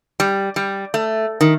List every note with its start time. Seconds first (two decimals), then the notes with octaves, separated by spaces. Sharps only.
0.20 G3
0.56 G3
0.94 A3
1.41 D#3